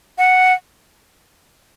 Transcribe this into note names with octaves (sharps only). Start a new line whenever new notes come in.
F#5